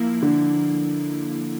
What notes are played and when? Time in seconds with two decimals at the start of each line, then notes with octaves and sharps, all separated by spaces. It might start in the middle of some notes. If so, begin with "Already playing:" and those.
Already playing: F3 A#3 E4
0.22 D3